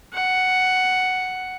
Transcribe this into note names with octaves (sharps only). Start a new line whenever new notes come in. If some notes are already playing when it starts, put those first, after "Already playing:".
F#5